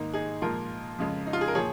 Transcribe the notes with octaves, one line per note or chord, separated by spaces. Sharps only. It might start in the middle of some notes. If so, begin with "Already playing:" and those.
Already playing: G#2 D#3 A#3 D#4
D#4 G#4
A#2 F3 G#3 F4 A#4
F2 C#3 G#3
D#4
F4
G#4
A#4
A#2 F3 G#4 C#5